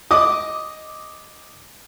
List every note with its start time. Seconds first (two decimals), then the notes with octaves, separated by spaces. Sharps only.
0.11 D#5 D6 D#6